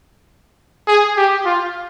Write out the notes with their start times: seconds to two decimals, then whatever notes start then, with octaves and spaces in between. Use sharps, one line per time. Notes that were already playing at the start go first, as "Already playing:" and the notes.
0.87 G#4
1.17 G4
1.45 F4